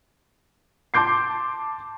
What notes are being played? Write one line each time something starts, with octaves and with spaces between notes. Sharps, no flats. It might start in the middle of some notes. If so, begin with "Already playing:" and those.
A5 C6 D6 G6 C7